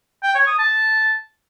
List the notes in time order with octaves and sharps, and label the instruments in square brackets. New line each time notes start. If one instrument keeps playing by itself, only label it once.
[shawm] G5
C#5
D#6
A5